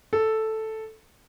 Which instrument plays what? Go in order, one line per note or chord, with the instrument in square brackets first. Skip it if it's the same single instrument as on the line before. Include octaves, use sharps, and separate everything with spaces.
[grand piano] A4